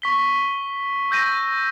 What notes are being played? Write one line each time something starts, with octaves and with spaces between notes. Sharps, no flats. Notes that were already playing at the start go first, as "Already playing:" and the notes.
C#6 B6 G7
E6 G6 A#6 D#7